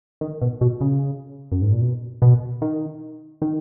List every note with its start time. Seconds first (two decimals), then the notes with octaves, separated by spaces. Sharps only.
0.21 D#3
0.42 B2
0.61 B2
0.81 C#3
1.52 F#2
1.62 G#2
1.72 A#2
1.81 B2
2.22 B2
2.62 D#3
3.42 D#3